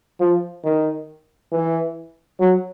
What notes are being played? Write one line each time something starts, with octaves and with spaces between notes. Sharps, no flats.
F3
D#3
E3
F#3